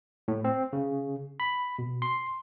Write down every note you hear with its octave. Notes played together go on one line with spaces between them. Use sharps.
A2
C4
C#3
B5
B2
C6